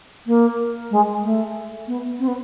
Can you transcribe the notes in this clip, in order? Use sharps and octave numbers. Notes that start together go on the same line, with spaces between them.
A#3
G#3
A3
B3
C4
B3